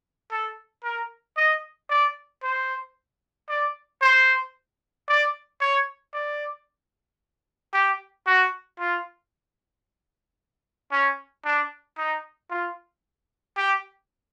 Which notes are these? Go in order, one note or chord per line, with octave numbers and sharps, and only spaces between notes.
A4
A#4
D#5
D5
C5
D5
C5
D5
C#5
D5
G4
F#4
F4
C#4
D4
D#4
F4
G4